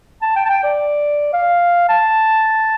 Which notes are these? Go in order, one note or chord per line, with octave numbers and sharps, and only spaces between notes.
A5
G5
A5
G5
D5
F5
A5